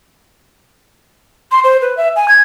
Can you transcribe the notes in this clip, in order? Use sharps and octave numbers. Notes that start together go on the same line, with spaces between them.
C6
C5
B4
E5
G#5
G#6